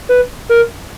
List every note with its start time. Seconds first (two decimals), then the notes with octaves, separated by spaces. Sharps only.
0.09 B4
0.49 A#4